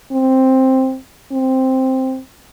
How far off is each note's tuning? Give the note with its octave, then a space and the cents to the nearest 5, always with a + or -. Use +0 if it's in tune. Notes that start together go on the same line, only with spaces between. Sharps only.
C4 +5
C4 +0